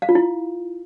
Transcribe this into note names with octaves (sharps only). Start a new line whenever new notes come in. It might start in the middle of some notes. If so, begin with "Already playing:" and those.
F5
F4
E4